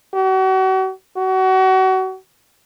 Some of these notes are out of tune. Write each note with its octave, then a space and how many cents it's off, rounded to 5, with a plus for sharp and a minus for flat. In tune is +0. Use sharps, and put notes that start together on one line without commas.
F#4 +40
F#4 +30